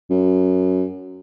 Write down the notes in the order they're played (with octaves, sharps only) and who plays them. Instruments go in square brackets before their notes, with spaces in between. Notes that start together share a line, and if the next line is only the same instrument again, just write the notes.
[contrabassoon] F#2